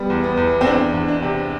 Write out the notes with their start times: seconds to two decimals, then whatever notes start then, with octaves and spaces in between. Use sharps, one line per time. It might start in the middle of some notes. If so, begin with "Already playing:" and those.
Already playing: G3 B3
0.10 E2
0.24 B3
0.37 E2
0.61 C4
0.65 E2 D4
0.94 E2
1.08 D4
1.22 C3